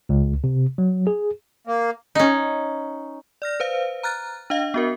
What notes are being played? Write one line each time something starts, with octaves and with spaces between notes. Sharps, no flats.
C#2
C3
F#3
G#4
A#3
C#4 D#4
D5 F6 A#6
B4 C5 F5
A#5 F6 F#6 A6
D4 D#5 F5
B3 F#4 A#4